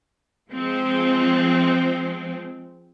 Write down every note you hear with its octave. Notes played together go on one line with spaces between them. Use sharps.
F3 G#3 C4